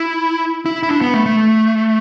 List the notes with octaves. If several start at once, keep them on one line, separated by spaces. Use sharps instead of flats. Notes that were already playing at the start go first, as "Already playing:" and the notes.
Already playing: E4
E4
E4
D4
B3
A3
A3